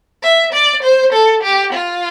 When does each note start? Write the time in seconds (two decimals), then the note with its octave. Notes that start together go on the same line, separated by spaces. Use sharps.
0.23 E5
0.53 D5
0.83 C5
1.13 A4
1.43 G4
1.73 F4